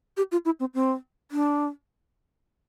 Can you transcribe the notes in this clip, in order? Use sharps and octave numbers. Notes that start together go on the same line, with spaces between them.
G4
F4
E4
C4
C4
D4